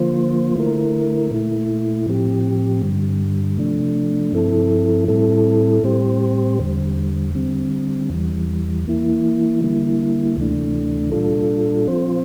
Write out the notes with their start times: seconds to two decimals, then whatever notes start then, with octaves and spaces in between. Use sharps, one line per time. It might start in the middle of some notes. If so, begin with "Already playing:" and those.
Already playing: D3 F3 A#3 F4 C5
0.56 D3 A3 E4 A#4
1.31 A#2 A3 E4
2.06 A2 F3 C4 G4
2.82 G2 D3 G3
3.58 C3 F3 A3 D4
4.32 G2 F3 C4 E4 A4
5.08 A2 G3 C4 E4 A4
5.84 A2 G3 C4 G4 C5
6.59 E2 D3 G3
7.35 D3 G3 C4
8.10 E2 E3 G3
8.86 E3 A#3 E4
9.61 D3 G3 A#3 E4
10.37 D2 C3 E3 A3 D4
11.12 A#2 G3 D4 F4 A4
11.87 F3 C4 F4 C5